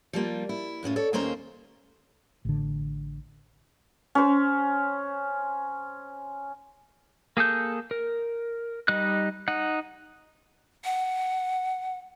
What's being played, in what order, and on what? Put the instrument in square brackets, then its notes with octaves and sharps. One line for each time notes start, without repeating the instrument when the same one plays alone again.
[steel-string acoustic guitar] F3 G3 A#3 F4
E4
F#2 A2 C#4 F4
A4 C#5 D5
D#2 A#2 A#3 C#4 C5 A#5
[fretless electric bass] A1 D3
[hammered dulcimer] C#4 C5
[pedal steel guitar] A#3 G#4 A4 G6
A#4
G3 D#4 D#5 F#6
D#4 F#5
[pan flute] F#5